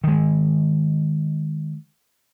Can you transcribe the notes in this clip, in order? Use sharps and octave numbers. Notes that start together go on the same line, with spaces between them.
D#3 G#3